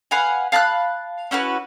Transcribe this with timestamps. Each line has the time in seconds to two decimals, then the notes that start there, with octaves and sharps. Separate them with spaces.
0.11 B4 F5 F#5 G#5
0.52 F5 A5 B5 F#6
1.31 C#4 E4 F#4 B4